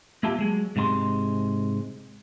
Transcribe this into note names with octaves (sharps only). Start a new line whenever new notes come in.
A#3 E4 F4 G4 A5
F#3 G#3
G#2 C3 G#3 B5 C6